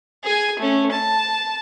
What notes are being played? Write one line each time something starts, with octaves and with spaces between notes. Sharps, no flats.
G#4 G#5
A3 C#4
A5